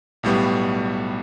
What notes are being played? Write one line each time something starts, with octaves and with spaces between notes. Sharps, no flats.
B1 A2 G3 B3